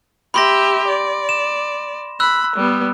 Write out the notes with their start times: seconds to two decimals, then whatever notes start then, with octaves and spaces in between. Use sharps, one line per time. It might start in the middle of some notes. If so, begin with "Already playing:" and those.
0.34 G4 E5 B5 C6 A#6
0.88 D5
1.29 E7
2.20 B5 E6 F#6
2.56 G3 B3